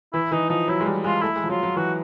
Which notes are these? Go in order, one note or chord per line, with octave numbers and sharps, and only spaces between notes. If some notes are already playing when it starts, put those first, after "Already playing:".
E3 E4
E3 D#4
F3 D#4
F#3 E4
G#3
G3
G#3 F4
A3 E4
G#3
F3
F#3 F4
F#3
E3 F#4